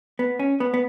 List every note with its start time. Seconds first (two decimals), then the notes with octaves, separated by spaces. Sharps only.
0.19 B3
0.39 C#4
0.60 B3
0.74 B3